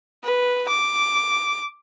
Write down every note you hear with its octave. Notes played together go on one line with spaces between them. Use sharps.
B4
D6